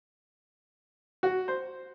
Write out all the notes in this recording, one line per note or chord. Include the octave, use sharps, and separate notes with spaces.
F#4
C5